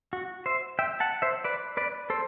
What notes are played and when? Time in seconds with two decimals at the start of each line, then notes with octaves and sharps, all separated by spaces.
0.13 F#4
0.46 C5 E5
0.79 E5 G5
1.00 F#5 A5
1.22 C5 E5
1.44 B4 D5
1.77 B4 D5
2.10 A4 C5